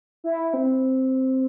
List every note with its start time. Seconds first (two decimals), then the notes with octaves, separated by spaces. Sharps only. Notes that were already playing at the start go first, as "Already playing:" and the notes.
0.24 E4
0.54 C4